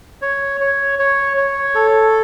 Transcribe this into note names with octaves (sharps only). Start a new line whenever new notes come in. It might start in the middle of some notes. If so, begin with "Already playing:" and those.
C#5
C#5
C#5
C#5
A4